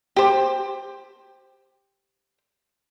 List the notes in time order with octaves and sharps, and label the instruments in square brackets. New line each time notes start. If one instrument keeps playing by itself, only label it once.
[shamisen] G4 C5